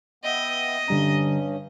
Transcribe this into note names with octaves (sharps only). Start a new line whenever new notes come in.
B3 D#5 E5 G5
G2 D3 G3 C#4 A#5